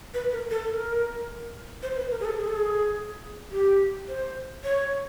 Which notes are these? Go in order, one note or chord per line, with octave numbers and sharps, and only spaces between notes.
B4
A#4
A4
A#4
C5
B4
A#4
G#4
A4
G#4
A4
G#4
G4
C5
C#5